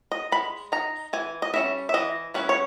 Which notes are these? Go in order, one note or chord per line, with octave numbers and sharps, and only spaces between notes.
D#5
G#3 B5
D#4 A#5
E3 G#5
D#5
G3 C#4 E4 E5
E5
E3 D#5
G3 C#4 E4 B4
C#5